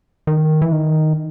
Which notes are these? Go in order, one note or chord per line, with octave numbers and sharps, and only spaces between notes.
D#3
E3
D#3